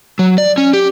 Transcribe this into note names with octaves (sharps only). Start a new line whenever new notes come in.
F#3
D5
C#4
G4